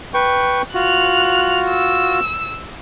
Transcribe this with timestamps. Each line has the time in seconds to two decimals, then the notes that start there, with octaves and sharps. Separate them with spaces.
0.14 B4 G5 C#6
0.74 F4 F#4 F#6 F7
1.68 E6